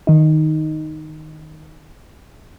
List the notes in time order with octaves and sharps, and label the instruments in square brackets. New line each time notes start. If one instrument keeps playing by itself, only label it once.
[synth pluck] D#3 D#4